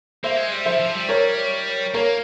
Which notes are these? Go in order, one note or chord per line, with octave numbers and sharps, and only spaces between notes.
A#3 C5 E5
G#3
G3
F3 C5 E5
F3
G3
A#4 C#5
A#3 A#4 C#5